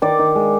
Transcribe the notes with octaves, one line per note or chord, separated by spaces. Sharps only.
D#3 D5
D#3
G#3